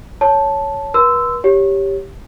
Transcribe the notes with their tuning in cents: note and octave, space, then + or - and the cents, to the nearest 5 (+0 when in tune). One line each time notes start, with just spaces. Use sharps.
C#5 +5 A5 -5
B4 -40 C6 -30 E6 +0
G4 +0 C#5 +0